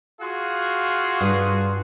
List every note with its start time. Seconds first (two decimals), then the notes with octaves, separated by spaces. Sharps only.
0.20 F4 F#4 G#4
1.21 G2